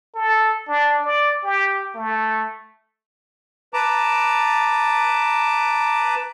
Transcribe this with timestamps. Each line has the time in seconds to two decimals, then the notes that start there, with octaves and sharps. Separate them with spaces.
0.15 A4
0.68 D4
1.04 D5
1.44 G4
1.95 A3
3.74 B4 A5 A#5 D6